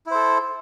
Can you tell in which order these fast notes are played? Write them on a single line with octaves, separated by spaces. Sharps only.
E4 C5 A4